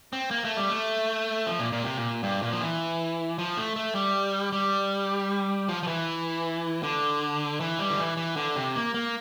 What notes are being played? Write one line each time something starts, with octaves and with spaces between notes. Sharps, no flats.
C4
A#3
A3
G3
A3
F3
A#2
A#2
C3
A#2
G2
A#2
F3
E3
F3
A3
A3
G3
G3
F3
F3
E3
D3
E3
G3
D3
E3
E3
D3
C3
A#3
A#3